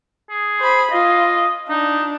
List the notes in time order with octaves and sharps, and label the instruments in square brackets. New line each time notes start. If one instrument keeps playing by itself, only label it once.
[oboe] G#4
[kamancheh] C5 B5
[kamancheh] F4 [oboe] D#5
[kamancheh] D4 [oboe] D#4